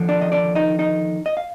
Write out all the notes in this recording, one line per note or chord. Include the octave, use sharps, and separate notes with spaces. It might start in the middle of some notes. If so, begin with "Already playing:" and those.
Already playing: D#2 D3 F3
D4 D5
D#5
D4 D5
D#4 D#5
D#4 D#5
D#5
F5